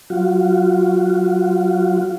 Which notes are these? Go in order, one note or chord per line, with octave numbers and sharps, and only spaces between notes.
F#3 F4 F#4